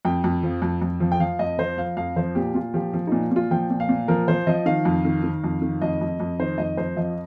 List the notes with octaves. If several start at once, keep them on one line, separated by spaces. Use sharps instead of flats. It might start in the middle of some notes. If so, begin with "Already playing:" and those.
F2 G5
F2
F3
F2
F2
F3
G5
F3 F5
F2 D#5
F3 C5
F3 F5
F2 F5
F3 C5
A#2 G4
A#2 F4
F3 G4
F3
A#2 D#4
A#2 F4
F3 G5
A#2
F5
A#2
F3 A#4
F3 C5
F3 D#5
D#3 F5
F2
D#3
D#3
F2
D#3
F2 D#5
F2
F2
D#3 C5
F2 D#5
F2 C5
F3 D#5